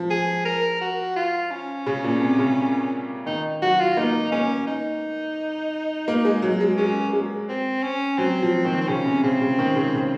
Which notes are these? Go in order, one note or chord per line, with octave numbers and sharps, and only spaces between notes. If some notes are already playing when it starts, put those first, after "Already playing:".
Already playing: F3
G#4
A#4
F#4
F4
C#4
C#3
A#2
C3
C#3
D#3 D#4
F#3 F#4
F4
A#3 D#4
A#3 C#4
D#4
A#3
G#3
F#3
G#3
G#3 C#4
G#3
C4
C#4
F#3 C4
F3
D#3
C4
C#3 C#4
C3
C#3 C4
C#3
D#3
C#3
C#3